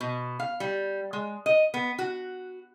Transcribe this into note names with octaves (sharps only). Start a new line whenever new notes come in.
B2
F5
G3
G#3
D#5
B3
F#4